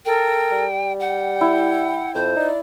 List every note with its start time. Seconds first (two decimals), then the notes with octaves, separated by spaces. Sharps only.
0.05 A4 A#4 G5
0.52 G3
1.00 F#5 G5
1.41 E4
2.15 F2 C5
2.36 D#4 D5